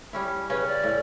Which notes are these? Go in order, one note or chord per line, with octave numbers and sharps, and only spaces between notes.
G3 C#4 E4
C#3 C#4 B4
D5
A2